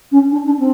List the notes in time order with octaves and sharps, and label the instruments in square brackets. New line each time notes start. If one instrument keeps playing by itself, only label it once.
[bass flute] C#4
D4
D4
C4